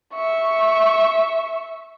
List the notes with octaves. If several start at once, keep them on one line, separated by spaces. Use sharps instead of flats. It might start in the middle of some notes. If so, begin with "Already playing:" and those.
E5 C#6